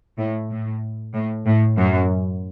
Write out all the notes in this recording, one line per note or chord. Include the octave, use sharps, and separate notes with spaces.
A2
A2
A2
A2
F#2